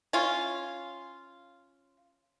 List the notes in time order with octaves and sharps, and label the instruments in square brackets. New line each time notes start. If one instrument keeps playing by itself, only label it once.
[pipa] C#4 F4